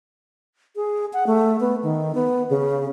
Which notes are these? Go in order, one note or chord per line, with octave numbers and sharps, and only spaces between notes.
G#4
F#5
A3
B3
D#3
B3
C#3